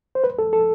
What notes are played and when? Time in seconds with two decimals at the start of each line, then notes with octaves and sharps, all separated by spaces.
0.15 C5
0.24 B4
0.39 A4
0.53 A4